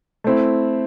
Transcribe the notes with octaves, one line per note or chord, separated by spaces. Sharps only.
A3 C4 E4